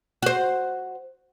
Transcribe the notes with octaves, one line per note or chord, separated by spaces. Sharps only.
F#4 C5